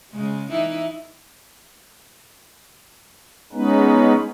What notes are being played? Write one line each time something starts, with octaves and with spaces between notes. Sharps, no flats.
C#3 G#3
E3 D#4 E4
G#3 B3 C#4 D#4 B4